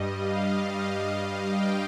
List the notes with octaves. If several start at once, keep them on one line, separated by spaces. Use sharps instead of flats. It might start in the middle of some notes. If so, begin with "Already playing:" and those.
Already playing: G2 G3 D#5
F5
G5